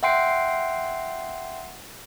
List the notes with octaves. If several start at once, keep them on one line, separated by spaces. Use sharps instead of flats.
E5 F#5 G5 C6 C7 D7